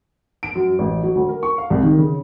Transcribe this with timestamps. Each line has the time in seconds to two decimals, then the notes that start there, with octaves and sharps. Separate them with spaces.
0.43 D7
0.55 F#2
0.79 A1
1.03 F#3
1.15 D2
1.29 A#4
1.43 C#6
1.58 F5
1.70 C2
1.83 D#3
1.98 C#3